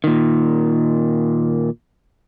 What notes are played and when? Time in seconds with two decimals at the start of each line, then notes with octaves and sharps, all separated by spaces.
0.04 A#2 D#3